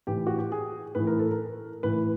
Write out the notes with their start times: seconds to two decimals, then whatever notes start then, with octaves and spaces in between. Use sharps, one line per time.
0.07 A2 E3 G4
0.27 F#4
0.38 G4
0.52 G#4
0.95 A2 E3 B4
1.07 A#4
1.19 A4
1.31 A#4
1.83 A2 E3 B4